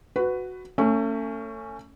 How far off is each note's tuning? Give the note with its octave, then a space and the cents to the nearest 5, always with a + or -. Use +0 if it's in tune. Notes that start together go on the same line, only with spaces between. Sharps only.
F#4 +0 B4 +15
A3 +35 C#4 +0